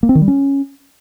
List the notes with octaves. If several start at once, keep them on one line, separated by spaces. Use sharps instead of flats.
A#3
C4
D#3
G3
C#4